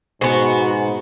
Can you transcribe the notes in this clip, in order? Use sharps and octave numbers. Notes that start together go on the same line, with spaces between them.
G#2 B2 B3 F#4 G#4 C5 G#5